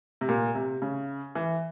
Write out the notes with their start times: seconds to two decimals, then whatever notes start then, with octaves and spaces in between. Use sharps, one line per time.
0.21 C3
0.29 A#2
0.55 C3
0.82 C#3
1.35 E3